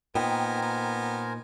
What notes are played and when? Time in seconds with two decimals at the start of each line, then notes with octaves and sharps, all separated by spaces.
0.15 A#2 B3 D#4 A#4 C5 G5 G#5
0.62 B3